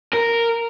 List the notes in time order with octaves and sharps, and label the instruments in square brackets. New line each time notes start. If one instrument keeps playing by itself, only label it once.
[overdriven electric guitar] A#4